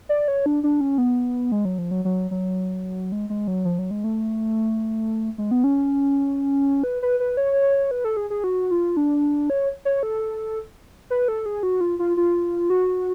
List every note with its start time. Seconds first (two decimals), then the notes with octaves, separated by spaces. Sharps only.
0.09 D5
0.28 C#5
0.46 D4
0.63 D4
0.81 C#4
0.98 B3
1.52 G#3
1.65 F#3
1.78 F3
1.91 F#3
2.05 F#3
2.31 F#3
3.12 G#3
3.30 G#3
3.48 F#3
3.65 F3
3.79 F#3
3.91 G#3
4.04 A3
5.38 G#3
5.51 B3
5.64 C#4
6.84 B4
7.02 B4
7.20 B4
7.37 C#5
7.91 B4
8.04 A4
8.17 G#4
8.30 G#4
8.44 F#4
8.71 F4
8.97 D4
9.50 C#5
9.85 C#5
10.03 A4
11.10 B4
11.28 A4
11.46 G#4
11.63 F#4
11.81 F4
11.99 F4
12.17 F4
12.70 F#4